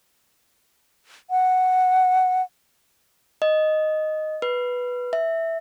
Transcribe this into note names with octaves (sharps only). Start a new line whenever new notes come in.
F#5
D#5
B4
E5